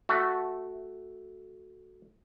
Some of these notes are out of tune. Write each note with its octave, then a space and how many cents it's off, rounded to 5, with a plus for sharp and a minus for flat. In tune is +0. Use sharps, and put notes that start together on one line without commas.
A3 +0 F#4 +0